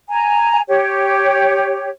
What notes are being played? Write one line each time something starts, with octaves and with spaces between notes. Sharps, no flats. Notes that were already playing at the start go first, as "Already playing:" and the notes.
G#5 A#5
G4 C#5